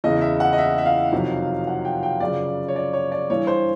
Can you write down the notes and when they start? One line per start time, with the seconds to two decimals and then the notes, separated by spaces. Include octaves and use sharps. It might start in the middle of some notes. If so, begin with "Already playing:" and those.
0.04 E2 C#3 E3 D#5
0.21 E5
0.40 F#5
0.53 D#5
0.58 E5
0.78 E5
0.86 F5
1.12 F2 C3 D#3 F#3
1.67 F#5
1.85 G5
2.03 G5
2.20 F#2 C#3 F3 D5
2.68 C#5
2.76 D5
2.93 C#5
3.12 D5
3.30 G2 E3 C#5
3.47 C5